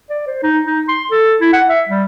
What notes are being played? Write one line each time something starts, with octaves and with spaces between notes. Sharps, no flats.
D5
C5
D#4
D#4
C6
A4
E4
F#5
E5
G3